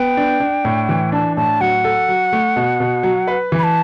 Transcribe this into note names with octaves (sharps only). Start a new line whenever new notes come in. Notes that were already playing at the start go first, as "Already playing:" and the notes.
Already playing: B3 G5
D4
D4
A2
E3
D4 A5
A2 A5
F#3 F#5
A4
F#3
A3
B2
B2
F#3
B4
E3
B5
A5